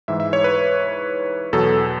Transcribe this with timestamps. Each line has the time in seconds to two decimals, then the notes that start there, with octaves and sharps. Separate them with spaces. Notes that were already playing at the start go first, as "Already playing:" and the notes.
0.08 G#2 E3 E5
0.20 E5
0.33 C#5
0.44 B4
1.53 E2 B2 F#3 A4